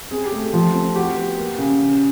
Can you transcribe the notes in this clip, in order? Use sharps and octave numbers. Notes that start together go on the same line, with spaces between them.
C4 G#4
G4
A3
F3
C4
F#4 G4
B3
A#3
C#3
C#4